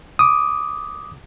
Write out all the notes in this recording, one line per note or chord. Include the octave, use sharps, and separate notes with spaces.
D6 D#6